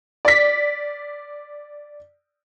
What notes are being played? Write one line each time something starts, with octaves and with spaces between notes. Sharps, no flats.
D5 B6